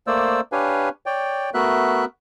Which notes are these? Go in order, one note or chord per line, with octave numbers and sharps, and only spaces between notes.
A3 A#3 C5 D5 E6
D4 G4 B4 C#5 F5 G#5
C#5 D5 G5
A3 B3 F#4 A#4 E5 F#6